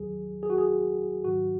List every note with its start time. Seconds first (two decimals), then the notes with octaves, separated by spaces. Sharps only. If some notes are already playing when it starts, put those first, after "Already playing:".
Already playing: D#2 D#3 F#3 G#4
0.43 G#4
0.50 F#4
0.58 G#4
1.24 G#2 D#3 F#3 F#4